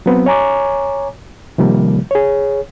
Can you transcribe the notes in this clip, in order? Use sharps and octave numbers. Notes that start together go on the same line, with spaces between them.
F#3 B3 C4
C#5 G#5 A#5 C#6 D6
C3 D#3 F3 G3 A#3
G#4 C#5